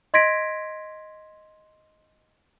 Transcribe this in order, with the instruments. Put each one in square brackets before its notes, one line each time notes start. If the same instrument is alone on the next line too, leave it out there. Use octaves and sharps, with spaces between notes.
[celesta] D#5 C6 G#6 A#6 B6 D7